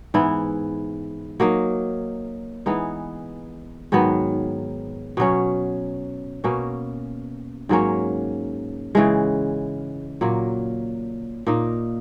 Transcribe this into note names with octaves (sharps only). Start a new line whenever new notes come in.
G#2 E3 B3 E4
F#3 A#3 D#4
E3 G#3 B3 D#4
G#2 D#3 F#3 B3
B2 F#3 C#4
B2 A#3 C#4
G#2 F#3 A#3 C#4
C#3 E3 G#3
A#2 F#3 A#3
A#2 A#3 D#4